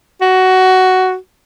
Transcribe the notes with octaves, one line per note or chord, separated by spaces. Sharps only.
F#4